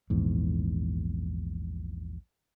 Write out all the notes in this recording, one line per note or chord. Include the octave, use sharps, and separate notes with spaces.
A#1 E2 G#2